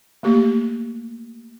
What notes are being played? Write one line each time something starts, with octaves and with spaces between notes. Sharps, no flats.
A3 A#3 G4